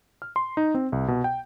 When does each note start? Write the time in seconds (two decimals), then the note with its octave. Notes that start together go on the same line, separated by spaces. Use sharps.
0.22 F6
0.36 C6
0.57 D#4
0.75 C4
0.92 C2
1.08 B2
1.24 G5